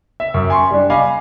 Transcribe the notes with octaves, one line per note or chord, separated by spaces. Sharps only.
E5
F#2
G#5 C6 C#6
G3 D4
D#5 F5 G#5 B5 D6